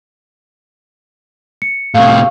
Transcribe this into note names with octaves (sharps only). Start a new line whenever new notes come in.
C#7
A2 C3 F5 C#6